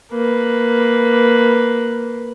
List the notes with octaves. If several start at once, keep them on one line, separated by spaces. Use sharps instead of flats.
A#3 B4